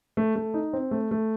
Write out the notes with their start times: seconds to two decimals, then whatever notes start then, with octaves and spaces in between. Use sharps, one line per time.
0.17 A3
0.35 A3
0.54 D#4
0.73 C4
0.91 A3
1.11 A3